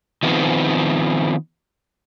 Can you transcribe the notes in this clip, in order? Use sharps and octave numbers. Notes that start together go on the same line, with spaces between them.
D#3 F3 B3 C4